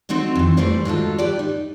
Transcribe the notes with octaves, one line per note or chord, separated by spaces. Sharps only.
A3 C4 D#4 F#4 C#5
F2 E3
E3 G3 A3 B4 C5 D5
G#2 F#3 F4 A4
G4 B4 D5
D#4